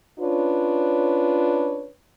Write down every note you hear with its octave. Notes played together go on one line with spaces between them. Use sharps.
C#4 D4 F4 B4 C#5